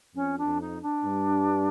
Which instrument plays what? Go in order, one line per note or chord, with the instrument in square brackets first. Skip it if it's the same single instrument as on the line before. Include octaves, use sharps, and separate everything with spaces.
[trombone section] F2 [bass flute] C#4
[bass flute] D4
[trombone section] F2
[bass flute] D#4
D4
[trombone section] G2